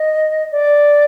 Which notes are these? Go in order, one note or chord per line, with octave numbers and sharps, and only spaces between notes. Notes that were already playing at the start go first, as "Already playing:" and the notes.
Already playing: D#5
D5